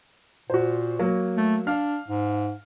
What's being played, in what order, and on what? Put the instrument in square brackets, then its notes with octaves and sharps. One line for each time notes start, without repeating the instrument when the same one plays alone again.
[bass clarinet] A#2 [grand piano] F#4 C5
[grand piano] F#3 A#3
[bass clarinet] A3
[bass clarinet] D4 [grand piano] F5 F6
[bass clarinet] G#2